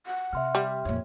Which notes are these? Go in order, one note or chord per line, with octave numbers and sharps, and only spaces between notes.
F#5
C3 E5 C6 F6
G3
F2 A#2 C#5